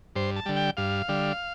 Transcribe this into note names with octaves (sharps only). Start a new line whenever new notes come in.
G2 C5
A5
D3 G3
G5
G2 F5
D3 G3